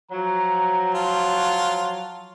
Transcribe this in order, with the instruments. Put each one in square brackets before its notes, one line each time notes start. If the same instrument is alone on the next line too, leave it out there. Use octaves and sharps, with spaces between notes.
[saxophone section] F3 F#3 [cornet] A#5
[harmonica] F4 [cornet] A5